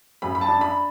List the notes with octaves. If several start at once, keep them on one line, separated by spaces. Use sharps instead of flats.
F#2 B5
B5
A5
D4
B5